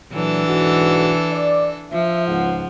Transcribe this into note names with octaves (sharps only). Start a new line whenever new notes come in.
A#2 E3 F#3 D4 A4
B1 G#2 F#4
D5
F3 E5
C#2 G#2 F#5